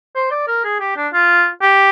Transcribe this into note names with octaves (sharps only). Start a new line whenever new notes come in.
C5
D5
A#4
G#4
G4
D4
F4
G4